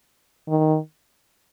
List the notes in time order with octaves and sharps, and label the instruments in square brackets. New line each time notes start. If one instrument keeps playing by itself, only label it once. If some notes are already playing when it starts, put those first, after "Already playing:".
[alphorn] D#3